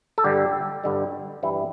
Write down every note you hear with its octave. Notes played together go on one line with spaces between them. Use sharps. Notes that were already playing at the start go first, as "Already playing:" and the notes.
A4
G2 D3 G3 G4
G2 D3 G3
G2 E3 G3 E4